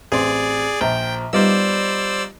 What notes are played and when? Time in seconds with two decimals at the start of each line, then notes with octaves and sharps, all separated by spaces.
0.12 A1 C4 G#4 D5 C6
0.81 A#1 F3 G5 A#5
1.33 G3 B3 D#4 F4 C5 D5 E6